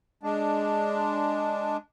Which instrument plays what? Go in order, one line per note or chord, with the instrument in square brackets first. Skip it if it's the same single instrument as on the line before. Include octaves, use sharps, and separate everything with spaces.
[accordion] G#3 D4